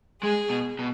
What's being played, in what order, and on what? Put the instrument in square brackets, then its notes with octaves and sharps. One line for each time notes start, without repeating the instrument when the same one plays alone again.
[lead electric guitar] G#3 [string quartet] G#4
[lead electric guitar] B2
B2